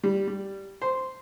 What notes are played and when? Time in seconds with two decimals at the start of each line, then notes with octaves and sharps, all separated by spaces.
0.04 G3
0.28 G3
0.82 C5